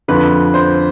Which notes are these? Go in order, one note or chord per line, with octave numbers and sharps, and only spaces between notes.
F2 D3 F3 B4
C5